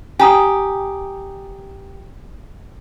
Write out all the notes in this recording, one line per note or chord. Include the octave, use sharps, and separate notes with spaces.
G4 G#5 A#5 D#6